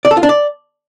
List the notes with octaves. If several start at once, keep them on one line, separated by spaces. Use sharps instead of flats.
D5
A4
F4
D4
D5